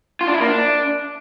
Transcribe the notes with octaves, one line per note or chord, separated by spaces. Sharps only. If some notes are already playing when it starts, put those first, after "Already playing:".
F4
D4
E4
A#3
D4